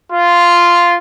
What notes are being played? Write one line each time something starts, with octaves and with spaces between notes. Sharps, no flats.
F4